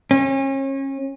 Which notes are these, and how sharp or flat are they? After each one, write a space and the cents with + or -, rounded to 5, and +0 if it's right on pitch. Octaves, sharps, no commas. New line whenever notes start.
C#4 -35